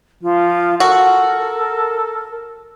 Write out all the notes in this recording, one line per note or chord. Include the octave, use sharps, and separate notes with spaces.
F3 F4
F#4 A4 A#4